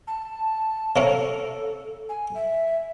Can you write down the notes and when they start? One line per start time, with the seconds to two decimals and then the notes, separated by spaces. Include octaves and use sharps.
0.07 A5
0.96 C3 A#3 C#4 A4
2.09 G#5
2.35 E5